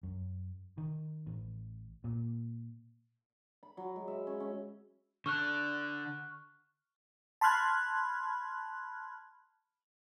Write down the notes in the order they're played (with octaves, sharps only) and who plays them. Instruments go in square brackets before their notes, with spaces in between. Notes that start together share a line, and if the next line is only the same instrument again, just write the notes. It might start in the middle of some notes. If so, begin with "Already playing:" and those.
[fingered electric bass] F#2
D#3
A1
A#2
[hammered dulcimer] B5
F#3
G#3
E5
C#4
C#4
[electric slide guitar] D3 [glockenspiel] C#6 F6 F#6
[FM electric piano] A5 B5 C6 F6 F#6 G#6